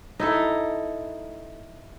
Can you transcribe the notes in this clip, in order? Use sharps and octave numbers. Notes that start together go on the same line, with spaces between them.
D#4 E4 A4